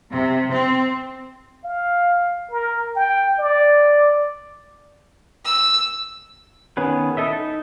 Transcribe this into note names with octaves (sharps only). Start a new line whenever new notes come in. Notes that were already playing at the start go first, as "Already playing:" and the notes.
C3
C4
F5
A#4
G5
D5
E6
D#3 B3 C#4 G#4 B4
E4 A4 D#5 E5
D#4